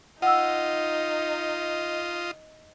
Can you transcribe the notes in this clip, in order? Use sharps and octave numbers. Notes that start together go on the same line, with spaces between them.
D#4 F4 D#5 F#5 E6